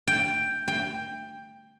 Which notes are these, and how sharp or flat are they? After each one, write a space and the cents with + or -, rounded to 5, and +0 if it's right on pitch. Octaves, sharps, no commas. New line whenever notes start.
G5 +5
G5 +10